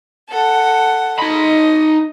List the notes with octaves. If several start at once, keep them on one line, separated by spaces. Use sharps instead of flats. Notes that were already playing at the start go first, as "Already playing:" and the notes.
A4 F#5
D#4 D#5 B5